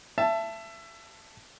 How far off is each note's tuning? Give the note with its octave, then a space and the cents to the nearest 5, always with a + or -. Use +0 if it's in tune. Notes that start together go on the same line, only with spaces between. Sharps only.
E5 +25 A5 +0